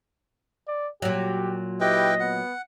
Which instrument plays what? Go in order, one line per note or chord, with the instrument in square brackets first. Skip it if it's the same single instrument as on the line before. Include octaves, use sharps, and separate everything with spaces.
[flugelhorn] D5
[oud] A#2 F#3 [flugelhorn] G4
[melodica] E4 B4 G5 [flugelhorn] G4 [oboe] D#5
[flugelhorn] B3 [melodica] F#5